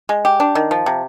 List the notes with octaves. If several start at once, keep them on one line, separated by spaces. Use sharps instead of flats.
G#3
G4
D4
D#3
F3
C3